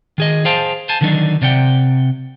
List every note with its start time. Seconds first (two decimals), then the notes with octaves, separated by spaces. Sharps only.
0.18 D#3 G#4 D#5
0.45 G#4 C5 F5 G5 A5
0.89 C5 F5 G#5 A5
1.01 D3 D#3 F#3 D4 D#4
1.42 C3 D5 F#5 G5